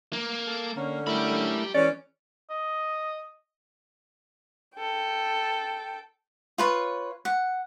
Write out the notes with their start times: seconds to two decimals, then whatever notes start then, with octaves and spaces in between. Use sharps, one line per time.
0.13 A#3
0.47 A4
0.77 D3 A#3 C#4
1.07 A3 E4 G4 A#4 B5
1.75 E3 G#3 C#4 D5
2.50 D#5
4.76 A4 G5
6.58 F4 B4 C#5
7.25 F#5